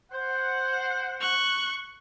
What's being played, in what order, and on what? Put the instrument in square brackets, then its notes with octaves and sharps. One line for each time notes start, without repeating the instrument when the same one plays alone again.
[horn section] C5 F#5
[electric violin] C#6 F#6